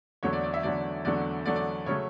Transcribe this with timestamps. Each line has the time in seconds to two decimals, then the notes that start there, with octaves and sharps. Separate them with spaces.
0.23 E2 D3 F#3 A3 C#5
0.33 D5
0.44 D5
0.54 E5
0.63 E2 D3 F#3 A3 D5
1.05 E2 D3 F#3 A3 D5
1.46 E2 D3 F#3 A3 D5
1.56 D5
1.86 C#3 F#3 A3 C#5